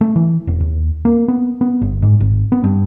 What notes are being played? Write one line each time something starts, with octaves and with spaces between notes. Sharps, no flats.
A3
E3
E1
D#2
A#3
B3
B3
G1
G#2
G#1
B3
G2